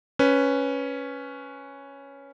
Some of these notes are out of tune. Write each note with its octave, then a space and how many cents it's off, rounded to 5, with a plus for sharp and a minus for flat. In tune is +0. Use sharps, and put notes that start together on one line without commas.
C#4 +0 B4 +0